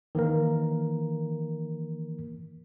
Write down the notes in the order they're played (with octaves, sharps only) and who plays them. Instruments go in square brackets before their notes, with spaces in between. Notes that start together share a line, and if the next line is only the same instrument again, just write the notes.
[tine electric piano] D#3 E3 A#3 A#4